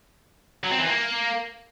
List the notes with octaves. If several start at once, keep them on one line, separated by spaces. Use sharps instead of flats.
F#3
C4
E3
A#3